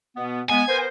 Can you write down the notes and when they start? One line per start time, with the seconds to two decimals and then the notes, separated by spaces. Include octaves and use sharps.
0.17 B2 B3
0.50 G#3 B3 G#5
0.68 B3 A#4 C5